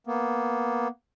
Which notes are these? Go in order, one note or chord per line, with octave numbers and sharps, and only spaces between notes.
A#3 B3